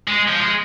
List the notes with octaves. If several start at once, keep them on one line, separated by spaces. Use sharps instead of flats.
G#3
F3
G#3